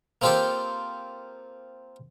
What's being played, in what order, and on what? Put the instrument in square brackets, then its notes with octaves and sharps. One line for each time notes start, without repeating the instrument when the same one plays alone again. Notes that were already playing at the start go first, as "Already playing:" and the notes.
[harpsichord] A#3 C4 F4 G4 A4 C5